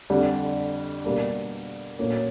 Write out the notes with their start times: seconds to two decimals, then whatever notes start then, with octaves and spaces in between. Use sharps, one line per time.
0.10 F2 D3 G3
1.04 B2 G3 A#3 D4
1.99 A#2 F#3 A#3 C#4